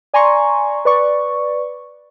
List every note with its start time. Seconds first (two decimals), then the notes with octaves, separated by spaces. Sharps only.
0.14 D5 G#5 A#5 C6 C#6
0.85 B4 D5 C#6